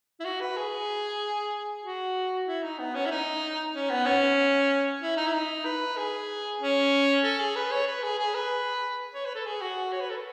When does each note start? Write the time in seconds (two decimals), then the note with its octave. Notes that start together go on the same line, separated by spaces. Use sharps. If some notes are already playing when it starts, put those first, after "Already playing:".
0.20 E4
0.25 F#4
0.41 B4
0.57 G#4
1.83 F#4
2.47 E4
2.63 D#4
2.79 B3
2.95 C#4
3.06 E4
3.11 D#4
3.74 C#4
3.90 B3
4.06 C#4
5.01 E4
5.17 D#4
5.27 E4
5.33 D#4
5.65 B4
5.97 G#4
6.60 C#4
7.23 A4
7.40 G#4
7.56 B4
7.71 C#5
7.87 B4
8.03 G#4
8.19 G#4
8.35 B4
9.14 C#5
9.25 B4
9.35 A4
9.46 G#4
9.62 F#4
9.92 C#5
10.01 B4
10.10 A4